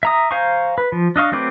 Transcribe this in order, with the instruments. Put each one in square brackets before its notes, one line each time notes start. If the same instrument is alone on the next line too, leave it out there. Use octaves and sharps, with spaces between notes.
[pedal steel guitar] E5 A#5 D#6
C5 F5 G#5 A#5 C#6
B4
F3
D4 D#5 F5 C#6
F#3 A3 C4 B4 D6